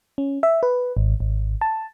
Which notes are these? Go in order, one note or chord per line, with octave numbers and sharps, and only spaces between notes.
C#4
E5
B4
G#1
G#1
A5